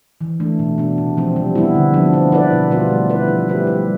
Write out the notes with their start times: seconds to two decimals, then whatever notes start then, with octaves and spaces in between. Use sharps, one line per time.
0.21 E3
0.40 A3 D4
0.59 B2
0.78 B3 D4
0.98 C3
1.17 F3 C4
1.36 G3
1.55 B3 E4
1.75 D3
1.94 F3 B3 D4
2.13 B3
2.32 E4 B4 D5
2.51 B2
2.71 G3 B3 F4 B4
2.91 A3
3.10 E4 B4 D5
3.28 F3
3.48 A3 E4 G4 B4
3.67 G3